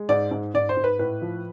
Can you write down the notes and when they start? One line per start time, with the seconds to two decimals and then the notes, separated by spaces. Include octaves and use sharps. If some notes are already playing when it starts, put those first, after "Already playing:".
Already playing: G#3
0.09 G#2 D5
0.31 G#2
0.54 G#2 D5
0.69 C5
0.77 G#2
0.84 B4
0.99 A2 B4
1.22 F3